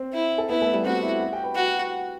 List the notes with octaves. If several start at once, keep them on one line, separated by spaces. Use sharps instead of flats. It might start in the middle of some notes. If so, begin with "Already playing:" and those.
Already playing: C4 C5
E4
A4
B3 E4 B4
A3 A4
G3 G4
C4 F#4 C5
E4 E5
F#4 F#5
G4 G5
B4 B5
F#4